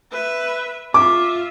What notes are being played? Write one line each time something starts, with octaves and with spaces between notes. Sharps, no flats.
B4 E5
F4 E5 D6